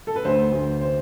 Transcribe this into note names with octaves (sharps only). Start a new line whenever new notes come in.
A4
B4
D2 C5
D2
C5